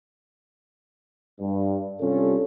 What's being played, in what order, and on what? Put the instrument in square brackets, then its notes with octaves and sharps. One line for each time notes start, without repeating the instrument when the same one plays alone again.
[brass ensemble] G2
C3 G3 C#4 D4 F4 A4